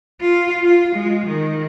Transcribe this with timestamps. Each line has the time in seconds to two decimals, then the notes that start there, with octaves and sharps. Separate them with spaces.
0.21 F4
0.64 F4
0.95 G#3
1.26 D#3